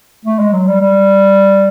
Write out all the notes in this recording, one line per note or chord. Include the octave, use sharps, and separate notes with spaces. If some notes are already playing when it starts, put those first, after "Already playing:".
A3
G#3
F#3
G3
G3